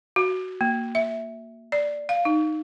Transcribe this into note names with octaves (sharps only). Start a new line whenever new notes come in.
F#4
A#3
E5
D5
F5
D#4